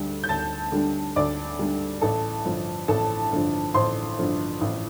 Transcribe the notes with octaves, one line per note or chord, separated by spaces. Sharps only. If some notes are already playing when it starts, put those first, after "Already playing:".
Already playing: D2 D3 G3 D4
G6
D2 A5 A6
D3 G3 D4
D2 D5 D6
D3 G3 D4
A1 A4 A5
G2 D3 F3
A1 A4 A5
G2 D3 F3
A1 C5 C6
G2 D3 F3
A1